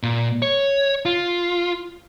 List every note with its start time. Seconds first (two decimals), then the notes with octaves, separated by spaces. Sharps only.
0.03 A#2
0.42 C#5
1.05 F4